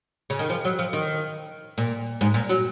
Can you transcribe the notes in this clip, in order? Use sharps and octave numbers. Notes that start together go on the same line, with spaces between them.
C#3
D#3
F3
F#3
F3
D#3
A#2
G#2
A#2
F#3